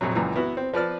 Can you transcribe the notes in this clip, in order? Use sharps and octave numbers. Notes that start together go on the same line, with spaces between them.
A#1 F2 C3 F#3
C#2 F#2 A#2 E3
B3 E4 F#4
C4
F3 B4 D5 F6